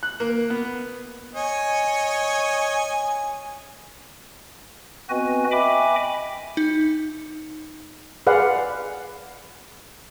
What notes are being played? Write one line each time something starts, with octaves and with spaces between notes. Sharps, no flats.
F#6
A#3
B3
C#5 D#5 G#5
B3 C4 F#4 B4 D#5 G#5
D#5 E5 G5 G#5 B5 D6
D#4
G#4 B4 D5 F5 F#5